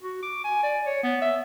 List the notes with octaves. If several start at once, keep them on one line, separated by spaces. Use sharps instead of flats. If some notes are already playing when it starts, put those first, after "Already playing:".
F#4
D6
G#5
D5
C#5
B3
E5